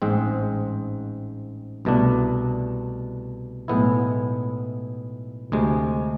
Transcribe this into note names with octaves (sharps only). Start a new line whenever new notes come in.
A1 G#2 G#3 C4
C2 B2 A3 D4
B1 A2 G#3 B3 E4
D2 C3 G#3